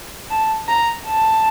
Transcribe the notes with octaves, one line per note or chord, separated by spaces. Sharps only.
A5
A#5
A5